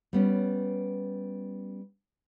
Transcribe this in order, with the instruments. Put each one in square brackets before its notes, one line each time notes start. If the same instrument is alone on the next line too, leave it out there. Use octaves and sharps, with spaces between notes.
[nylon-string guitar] G3 B3 C#4